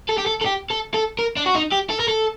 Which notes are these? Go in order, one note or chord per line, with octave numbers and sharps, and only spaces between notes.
A4
G4
A4
A4
G4
A4
A4
A#4
D4
F#4
D#4
G4
A4
A#4
A4